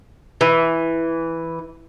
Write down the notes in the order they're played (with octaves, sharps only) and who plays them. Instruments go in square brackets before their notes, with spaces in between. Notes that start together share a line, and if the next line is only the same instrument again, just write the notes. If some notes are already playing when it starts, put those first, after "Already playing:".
[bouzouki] E3